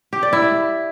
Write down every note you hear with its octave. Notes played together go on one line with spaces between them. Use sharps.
G4
D5
E4